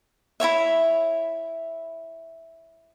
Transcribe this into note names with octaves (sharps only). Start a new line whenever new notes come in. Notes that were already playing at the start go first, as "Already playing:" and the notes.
E4 F#4 C#5 E5